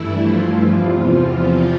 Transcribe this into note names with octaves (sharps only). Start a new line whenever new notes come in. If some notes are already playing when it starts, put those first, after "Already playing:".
Already playing: G2 E3 A3 E4
F3 F4
E2 C3 E3
F3 F4